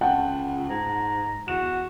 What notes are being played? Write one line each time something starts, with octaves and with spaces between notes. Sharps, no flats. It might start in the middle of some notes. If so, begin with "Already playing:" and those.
C#2 F#5 G5 A5
G#2 A#5
E2 F#4 E7